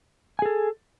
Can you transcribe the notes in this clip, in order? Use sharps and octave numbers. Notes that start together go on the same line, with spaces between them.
G#4 A4 G#5